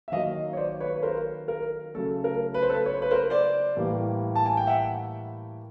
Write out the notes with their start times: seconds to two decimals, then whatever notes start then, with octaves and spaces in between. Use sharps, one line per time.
0.08 E5
0.12 D#3 F#3 A#3 D#5 F5
0.53 C#5
0.57 C5 D5
0.80 B4 C#5
0.96 B4
1.03 A#4 C5
1.48 A#4
1.95 C#3 F#3 A3 A4
2.24 A#4
2.54 B4
2.62 C5
2.70 A4 B4
2.86 C#5
2.94 C5
3.02 B4
3.11 A#4 C5
3.30 C5 D5
3.76 A2 E3 G3 A#3
4.36 A5
4.46 G#5
4.57 G5
4.67 E5 F#5